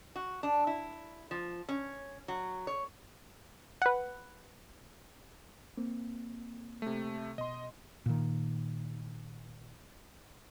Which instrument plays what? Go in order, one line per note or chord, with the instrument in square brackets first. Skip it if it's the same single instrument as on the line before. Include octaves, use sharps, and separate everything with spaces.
[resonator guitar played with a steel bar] F#4
D4
E4
F3
C#4
F#3
C#5
[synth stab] B4 F#5
[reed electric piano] A#3 C4
[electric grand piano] C3 A3
[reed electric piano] B2 C6 [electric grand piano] D#5
[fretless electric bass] A#2 D#3